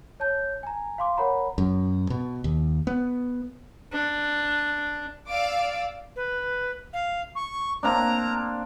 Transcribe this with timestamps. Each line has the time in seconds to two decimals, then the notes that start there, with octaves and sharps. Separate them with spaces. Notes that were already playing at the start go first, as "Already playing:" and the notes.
0.20 C#5 A5 G6
0.63 G#5 A#5
0.98 F5 C6 D6
1.17 A#4 C#5 F#5 A#5 B5
1.58 F#2
2.10 B2
2.44 D#2
2.87 B3
3.93 D4
5.29 D5 F5 D6 E6
6.16 B4
6.93 F5
7.35 C#6
7.83 A#3 C4 D4 A#5